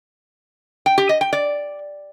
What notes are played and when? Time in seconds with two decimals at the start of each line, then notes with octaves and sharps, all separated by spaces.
0.86 G5
0.98 G4
1.09 D#5
1.21 G5
1.33 D5